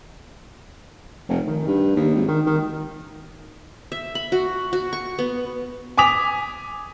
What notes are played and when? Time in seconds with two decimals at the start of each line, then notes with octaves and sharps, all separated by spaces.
1.29 F1
1.47 D#3
1.67 G2
1.95 D#2
2.14 G#1
2.28 D#3
2.46 D#3
3.92 E5
4.15 B5
4.32 F#4
4.73 F#4
4.93 C#6
5.19 B3
5.97 G#5 D6 D#6 B6 F7